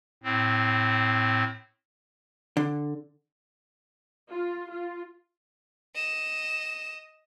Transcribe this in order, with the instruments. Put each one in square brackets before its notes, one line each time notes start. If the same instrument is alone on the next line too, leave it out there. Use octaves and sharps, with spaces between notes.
[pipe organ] A2 C4
[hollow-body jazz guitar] D3
[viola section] F4
F4
[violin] D#5 E7